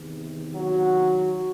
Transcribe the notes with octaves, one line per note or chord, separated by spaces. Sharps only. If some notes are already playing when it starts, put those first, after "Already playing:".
Already playing: E2 C3 D#3
F#3 F#4